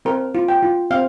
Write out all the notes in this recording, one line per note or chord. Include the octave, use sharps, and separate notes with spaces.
C4 A#4
F4
G5
F4
C4 F5